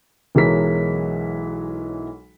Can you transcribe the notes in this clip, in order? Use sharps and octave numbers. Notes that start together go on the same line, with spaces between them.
B1 E3 F#3 G#3 A#4 B6